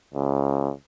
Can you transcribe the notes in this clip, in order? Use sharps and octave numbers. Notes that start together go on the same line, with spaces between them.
C#2